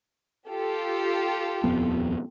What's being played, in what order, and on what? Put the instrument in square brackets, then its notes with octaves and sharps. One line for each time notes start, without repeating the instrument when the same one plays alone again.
[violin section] F4 G4 A4
[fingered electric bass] D#1 F2 B3